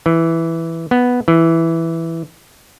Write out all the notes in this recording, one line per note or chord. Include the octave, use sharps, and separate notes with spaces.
E3
B3
E3